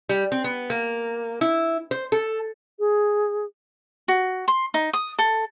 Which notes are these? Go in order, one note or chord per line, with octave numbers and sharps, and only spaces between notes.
G3
C4
B3
A#3
E4
C5
A4
G#4
F#4
C6
D#4
D#6
A4